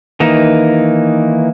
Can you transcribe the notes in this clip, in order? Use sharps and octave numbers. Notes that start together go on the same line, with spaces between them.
D#3 E3 A#3 D#4